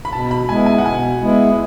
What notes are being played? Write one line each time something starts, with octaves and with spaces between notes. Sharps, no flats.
B5
B2 A5
B5
G#3 B3 E4 G#5
G#5
F#5
B2 G#5
G#3 B3 E4